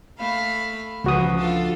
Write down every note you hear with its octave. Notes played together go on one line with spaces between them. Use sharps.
A3 F5 B5
C#2 C#3 E3 F3 F#4 D#6
D4 F4 A4